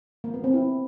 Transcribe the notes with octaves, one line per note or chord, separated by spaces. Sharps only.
A#3
B3
C4
E4